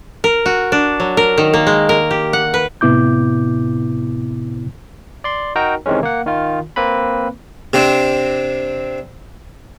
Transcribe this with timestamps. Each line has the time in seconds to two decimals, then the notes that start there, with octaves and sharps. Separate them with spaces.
0.24 A#4
0.46 F#4
0.72 D4
1.00 F#3
1.17 A#4
1.38 D#3
1.54 A#3
1.67 G#3
1.89 A#4
2.11 G4
2.33 F#5
2.54 B4
2.81 A2 C3 B3 E4 D6 G6
5.24 D5 C6
5.56 D#4 F#4 A#4 G5 A#5
5.86 C3 D#3 E3 G#3 C#4
6.03 A#3 F#5
6.26 D#3 F4
6.76 A#3 C4 B4 B5
7.73 C3 C4 D4